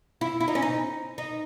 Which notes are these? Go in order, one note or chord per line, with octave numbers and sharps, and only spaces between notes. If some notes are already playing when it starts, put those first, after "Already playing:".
E4
E4
D#4
C#4
D#4
D#4